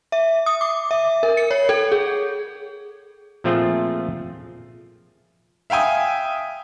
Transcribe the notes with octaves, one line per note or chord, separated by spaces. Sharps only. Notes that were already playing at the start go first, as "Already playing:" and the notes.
E5
D#6
D6
E5
A#4
C#7
C#5
A4
G#4
A#2 F3 A3 C4 F4 G#4
E5 F5 G5 G#5 D#6